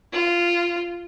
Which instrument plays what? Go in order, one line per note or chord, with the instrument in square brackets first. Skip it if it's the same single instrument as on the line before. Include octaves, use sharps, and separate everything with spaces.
[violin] F4